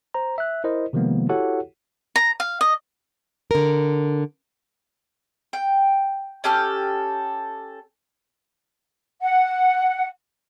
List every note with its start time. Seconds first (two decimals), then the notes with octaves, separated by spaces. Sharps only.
0.14 C5 A#5
0.38 E5 F#6
0.64 E4 A#4 C5 D#5
0.93 C3 D#3 F3 G#3 A#3 B3
1.29 E4 F#4 G4 A4 C#5 F#5
2.16 A#5
2.40 F5
2.61 D#5
3.51 D3 A#4
5.53 G5
6.44 C#4 G4 A4 F6
9.20 F#5